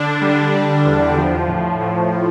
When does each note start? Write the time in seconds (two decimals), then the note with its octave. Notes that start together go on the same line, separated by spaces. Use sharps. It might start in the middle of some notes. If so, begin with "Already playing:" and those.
Already playing: D3 D4
0.21 G3
0.54 G3
0.85 E2
1.17 F3
1.48 A2
1.80 A2
2.12 A2